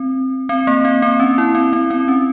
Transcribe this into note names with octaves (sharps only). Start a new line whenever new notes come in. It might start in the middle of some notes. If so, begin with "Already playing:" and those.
Already playing: C4
C4
A#3
C4
C4
C#4
E4
C4
C4
C4
C#4